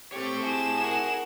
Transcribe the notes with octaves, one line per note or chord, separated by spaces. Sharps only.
A3 C4 G4 C#5 C#7
E4 G#4 A5 E7
F#4 A#4